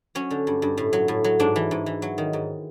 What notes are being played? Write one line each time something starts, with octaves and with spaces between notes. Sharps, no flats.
F#3 C#4
D3
G2
G2
A2
F#3
A2
F#3
G#2 D4
E3
G#2
E3
F#3
D#3
G#2